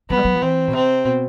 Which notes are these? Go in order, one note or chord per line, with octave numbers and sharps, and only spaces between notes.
F#3 B3
G3
F#3
F3
E3 C4
B2
C3 C4
B2